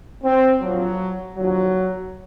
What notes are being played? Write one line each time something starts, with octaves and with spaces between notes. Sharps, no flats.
C4
A#1 A#2 F3 F#3
D#2 D3 F3 F#3